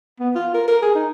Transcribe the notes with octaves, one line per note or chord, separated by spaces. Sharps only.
B3
F4
A#4
A#4
G#4
D#4